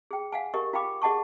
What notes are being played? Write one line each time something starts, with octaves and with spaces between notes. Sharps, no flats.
G#4 G5
F5 F#5 G#5
G4 A#4 D#5 C#6
F4 F5 G5 B5 D6
G#4 D#5 F#5 A5 C#6